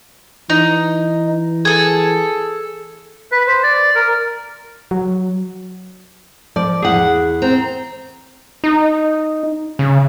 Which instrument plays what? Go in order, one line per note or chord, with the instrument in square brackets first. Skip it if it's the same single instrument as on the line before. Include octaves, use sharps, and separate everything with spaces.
[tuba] E3 [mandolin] D#4
[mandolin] G#4 A4
[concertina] B4
C5
D5
A#4
[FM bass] F#3
[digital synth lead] F3 [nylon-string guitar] D5
[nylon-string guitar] E2 F#5 [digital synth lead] G#4
[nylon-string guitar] C4 [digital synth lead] A#5
[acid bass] D#4
C#3